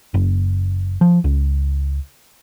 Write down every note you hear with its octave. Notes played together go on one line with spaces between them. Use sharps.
F#1
F3
C#2